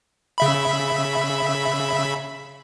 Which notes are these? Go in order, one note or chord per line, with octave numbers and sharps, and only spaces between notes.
C#3 E5 B5